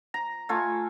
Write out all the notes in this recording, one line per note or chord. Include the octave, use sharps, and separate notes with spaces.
A#5
A3 F4 G#5